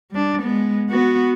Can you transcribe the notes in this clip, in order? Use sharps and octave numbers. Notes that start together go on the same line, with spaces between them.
G3 D4
G#3 B3
B3 F#4